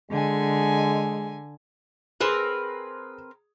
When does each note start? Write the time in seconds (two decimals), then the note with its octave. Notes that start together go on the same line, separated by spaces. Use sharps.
0.11 D3 G#3 G#5
2.20 C4 G#4 A#4 B4